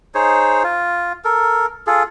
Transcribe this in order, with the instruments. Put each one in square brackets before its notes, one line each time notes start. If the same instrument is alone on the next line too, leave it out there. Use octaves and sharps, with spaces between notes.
[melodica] D#4 G#4 C5 C#5
F4
A4 A#4
F4 G#4 A4